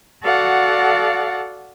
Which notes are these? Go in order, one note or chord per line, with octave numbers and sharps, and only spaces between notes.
F#4 A4 D5 F5 F#5